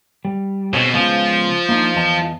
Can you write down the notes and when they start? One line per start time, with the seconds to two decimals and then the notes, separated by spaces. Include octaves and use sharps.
0.25 G3
0.73 B2 C4 G#4 C#5
0.94 C#3 F3 G#3 B3 F4
1.69 A#3 D4 D#4
1.95 E2 D#5 A5